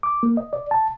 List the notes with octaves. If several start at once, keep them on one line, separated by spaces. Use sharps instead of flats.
D6
A#3
D#5
D5
A5